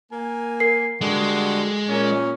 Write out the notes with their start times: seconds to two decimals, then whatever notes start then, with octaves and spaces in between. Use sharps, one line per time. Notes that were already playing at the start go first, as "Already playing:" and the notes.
0.12 A#3 G#5
0.60 A#4 C7
1.01 D3 G3 G#3 F#4
1.89 A#2 C#4